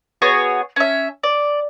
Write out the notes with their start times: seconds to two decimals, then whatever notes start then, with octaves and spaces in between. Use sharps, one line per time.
0.22 B3 F#4 G#4 C#5
0.76 C#4 E5
1.23 D5